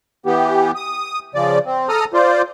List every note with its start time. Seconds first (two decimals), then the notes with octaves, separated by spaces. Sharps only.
0.26 E3 B3 G4
0.75 D#6
1.35 C#3 F3 D5
1.66 C4
1.89 A4 A#5 D#6 F6
2.14 F4 C5 D5